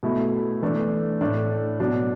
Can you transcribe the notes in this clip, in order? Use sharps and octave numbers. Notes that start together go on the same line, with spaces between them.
B2 A3 E4
E3 A3 D4
A2 A3 D4
B2 F#3 D4